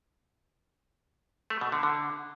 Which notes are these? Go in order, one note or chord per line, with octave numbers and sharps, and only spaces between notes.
A3
B2
D3
D3